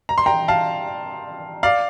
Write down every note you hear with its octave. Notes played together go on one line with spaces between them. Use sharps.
A#5
C6
G5 A#5
F5 A5
D5 F5